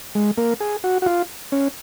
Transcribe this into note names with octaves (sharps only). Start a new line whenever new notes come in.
G#3
A#3
G#4
F#4
F#4
F4
C#4